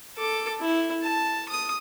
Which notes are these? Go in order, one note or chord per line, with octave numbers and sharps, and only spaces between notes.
A4 D6
E4
A5
D#6